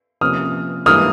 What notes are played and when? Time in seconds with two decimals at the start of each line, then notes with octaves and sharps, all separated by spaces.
0.21 C3 F3 A#3 C#4 D#6 F6
0.86 G#2 E3 G3 A#3 D4 D#6 F6